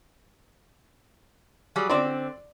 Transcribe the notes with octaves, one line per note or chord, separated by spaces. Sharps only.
F#3 G3 G#4
D3 C4 D5 C6 D6